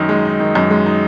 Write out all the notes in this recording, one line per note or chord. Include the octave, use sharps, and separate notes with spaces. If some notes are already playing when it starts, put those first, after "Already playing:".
Already playing: F#2 D#3 D#4
G#3
D#4
D#3
F#2
G#3
D#4